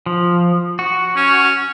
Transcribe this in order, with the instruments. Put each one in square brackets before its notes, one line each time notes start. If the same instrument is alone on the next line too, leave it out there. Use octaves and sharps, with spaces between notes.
[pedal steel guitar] F3
F#4
[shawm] C#4